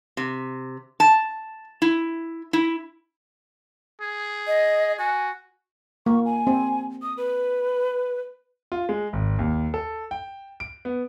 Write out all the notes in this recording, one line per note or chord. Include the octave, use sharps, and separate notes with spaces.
C3
A5
E4
E4
G#4
D#5
F#4 G#5
A#3 C#6
G#5
C4
D#6
B4
F4
G#3
G#1
D#2
A4
G5
D7
B3